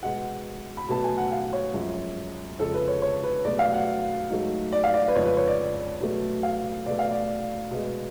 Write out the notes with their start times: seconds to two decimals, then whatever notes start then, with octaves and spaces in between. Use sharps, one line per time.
0.03 B2 G#3 F#5
0.77 B5
0.89 B2 F#3 A3 A5
1.04 G#5
1.18 F#5
1.32 F5
1.53 C#5
1.74 F#2 F3 G#3
2.59 F2 C#3 G#3 A4
2.74 B4
2.88 C#5
3.02 C#5
3.23 B4
3.45 B2 F#3 A3 D5
3.59 F5
3.73 F#5
4.30 G#2 F#3 A3
4.72 D5
4.84 F5
4.94 D5
5.08 B4
5.15 F2 C#3 G#3 C#5
5.26 B4
5.37 C#5
5.47 D5
6.01 B2 F#3 A3
6.43 F5
6.86 B2 A3 D5
6.99 F5
7.11 D5
7.71 B2 G#3